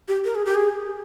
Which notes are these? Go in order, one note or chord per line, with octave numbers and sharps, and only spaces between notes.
G4
A#4
G#4
G4
G#4